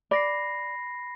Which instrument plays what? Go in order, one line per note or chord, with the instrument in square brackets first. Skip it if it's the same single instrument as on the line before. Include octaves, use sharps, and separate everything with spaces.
[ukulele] D5 [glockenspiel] B5 A#6 C7